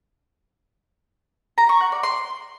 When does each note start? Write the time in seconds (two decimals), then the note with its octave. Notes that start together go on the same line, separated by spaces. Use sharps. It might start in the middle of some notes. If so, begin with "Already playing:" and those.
1.58 A#5
1.69 C#6
1.81 F#5
1.92 D5
2.03 C6